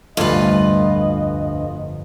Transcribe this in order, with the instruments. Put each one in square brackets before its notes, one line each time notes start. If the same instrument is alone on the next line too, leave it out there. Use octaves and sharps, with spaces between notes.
[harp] F1 G2 A5 [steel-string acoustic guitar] D2 [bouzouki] F4 B4 [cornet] D#5